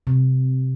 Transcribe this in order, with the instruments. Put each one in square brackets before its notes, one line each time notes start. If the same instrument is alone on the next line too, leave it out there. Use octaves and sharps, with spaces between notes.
[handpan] C3